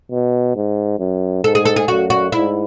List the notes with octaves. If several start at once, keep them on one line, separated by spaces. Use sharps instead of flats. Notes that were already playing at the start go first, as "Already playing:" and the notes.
B2
G#2
F#2
G#2 A4
G#4
A4
G#4
F#2 F#4
F#4
G#2 E4